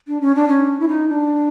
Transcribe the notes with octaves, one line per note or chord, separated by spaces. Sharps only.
D4
C#4
D4
C#4
E4
D#4
D4